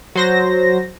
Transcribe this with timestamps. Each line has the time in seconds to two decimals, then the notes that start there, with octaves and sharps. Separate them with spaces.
0.16 F#3 C5 A#6